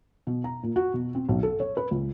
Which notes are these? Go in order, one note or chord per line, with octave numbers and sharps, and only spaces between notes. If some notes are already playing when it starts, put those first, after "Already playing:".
B2
A#5
A#2
F#4
B2
C4
B1
A4
C#5
B4
C#2